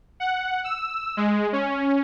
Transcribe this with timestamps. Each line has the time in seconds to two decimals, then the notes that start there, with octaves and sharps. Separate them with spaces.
0.20 F#5
0.64 E6
1.17 G#3
1.53 C#4